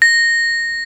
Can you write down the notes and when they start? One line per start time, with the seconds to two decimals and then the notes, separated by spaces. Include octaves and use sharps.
0.02 A#6